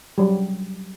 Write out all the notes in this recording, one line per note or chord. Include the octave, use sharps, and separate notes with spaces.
F#3 G3